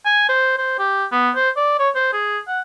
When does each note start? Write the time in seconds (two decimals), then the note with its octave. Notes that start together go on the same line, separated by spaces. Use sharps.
0.05 G#5
0.29 C5
0.58 C5
0.79 G4
1.12 B3
1.36 C5
1.57 D5
1.79 C#5
1.95 C5
2.13 G#4
2.48 F#5